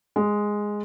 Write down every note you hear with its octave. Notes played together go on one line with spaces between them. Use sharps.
G#3